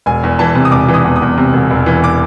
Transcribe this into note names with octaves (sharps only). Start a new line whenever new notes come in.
E1 G#5
E2
E3 A5
C3
D#6
E1 D6
E3
D#6
E2
D#6
E2
C3
E1
E1
E3
D6